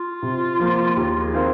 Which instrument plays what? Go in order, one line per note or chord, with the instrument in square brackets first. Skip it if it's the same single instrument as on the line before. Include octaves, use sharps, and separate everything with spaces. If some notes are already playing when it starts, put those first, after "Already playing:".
Already playing: [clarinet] F4
[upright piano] C3
F3 A#3
[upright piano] D#2 [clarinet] F4
[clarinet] G#4
[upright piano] D#3 C4 F4 A#4